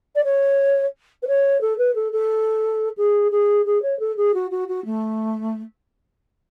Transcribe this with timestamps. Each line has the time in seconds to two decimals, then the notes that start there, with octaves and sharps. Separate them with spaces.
0.15 D5
0.24 C#5
1.22 B4
1.27 C#5
1.61 A4
1.78 B4
1.95 A4
2.12 A4
2.97 G#4
3.31 G#4
3.66 G#4
3.82 C#5
3.99 A4
4.17 G#4
4.34 F#4
4.51 F#4
4.68 F#4
4.85 A3